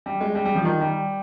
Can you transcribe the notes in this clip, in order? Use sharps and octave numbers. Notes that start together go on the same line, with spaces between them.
G3
G#3
G3
G3
F3
D#3
G3